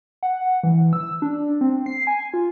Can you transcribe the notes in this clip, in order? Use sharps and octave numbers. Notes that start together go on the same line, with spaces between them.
F#5
E3
E6
D4
C4
C7
G#5
F4